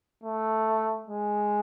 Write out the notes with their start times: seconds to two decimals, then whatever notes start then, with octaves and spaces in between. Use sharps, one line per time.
0.24 A3
1.08 G#3